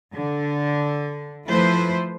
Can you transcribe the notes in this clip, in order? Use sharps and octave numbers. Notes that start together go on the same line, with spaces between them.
D3
F3 A3 E4 B4 C5